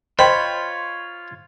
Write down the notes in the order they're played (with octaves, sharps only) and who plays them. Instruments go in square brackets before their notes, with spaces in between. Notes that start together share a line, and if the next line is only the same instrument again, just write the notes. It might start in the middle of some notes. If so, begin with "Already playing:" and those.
[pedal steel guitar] F4 C#5 [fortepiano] C5 [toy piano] D#5 G5 [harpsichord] B5